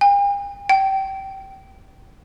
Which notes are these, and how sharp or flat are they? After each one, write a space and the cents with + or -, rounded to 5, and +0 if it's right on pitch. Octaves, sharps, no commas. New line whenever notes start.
G5 +45
G5 -20